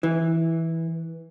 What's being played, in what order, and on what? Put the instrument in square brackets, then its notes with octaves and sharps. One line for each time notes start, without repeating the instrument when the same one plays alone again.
[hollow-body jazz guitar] E3